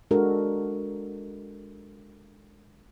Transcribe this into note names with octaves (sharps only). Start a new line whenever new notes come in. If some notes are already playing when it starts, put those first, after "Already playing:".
G#3 D4 F#4 A4 A#4